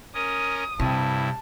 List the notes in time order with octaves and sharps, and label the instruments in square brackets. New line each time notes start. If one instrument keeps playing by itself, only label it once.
[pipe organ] C#4 A#4 [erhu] D#6
[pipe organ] G2 E4 [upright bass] C3 [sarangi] A5